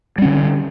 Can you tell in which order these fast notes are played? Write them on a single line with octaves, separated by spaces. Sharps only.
G3 C#4 D3